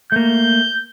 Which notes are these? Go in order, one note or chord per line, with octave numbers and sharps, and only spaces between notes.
A3 A#3 G6